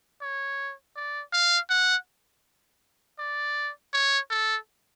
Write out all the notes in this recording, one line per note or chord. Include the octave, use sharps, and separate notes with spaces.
C#5
D5
F5
F#5
D5
C#5
A4